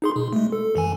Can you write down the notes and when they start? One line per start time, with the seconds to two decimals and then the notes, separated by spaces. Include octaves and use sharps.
0.02 D#4 G#4 C6
0.16 B2
0.33 G#3 A3
0.52 A4
0.76 F#2 E3 G#5